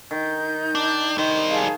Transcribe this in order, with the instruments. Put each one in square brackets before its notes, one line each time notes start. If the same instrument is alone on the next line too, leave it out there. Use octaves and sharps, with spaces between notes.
[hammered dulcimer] D#3 [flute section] D#4 G6
[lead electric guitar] D4
[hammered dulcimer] D#3 [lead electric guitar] G3 C5 [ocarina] D#5
[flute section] G#4 F5 A5